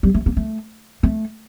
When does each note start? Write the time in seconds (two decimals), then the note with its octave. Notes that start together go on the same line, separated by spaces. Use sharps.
0.03 G3
0.14 A3
0.26 A#3
0.37 A3
1.03 A3